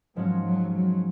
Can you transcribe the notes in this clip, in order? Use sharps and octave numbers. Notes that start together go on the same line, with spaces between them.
G#2 F3 F#3 G#3 C#4 F#4
F#3
F#3